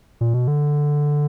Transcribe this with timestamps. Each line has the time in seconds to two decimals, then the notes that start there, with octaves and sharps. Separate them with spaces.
0.21 A#2
0.34 B2
0.48 D3